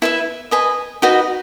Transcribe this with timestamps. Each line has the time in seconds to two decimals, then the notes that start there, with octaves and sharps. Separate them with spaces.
0.02 E4 B4 E5
0.51 B4 D#5 G#5
1.02 D#4 F#4 B4 D#5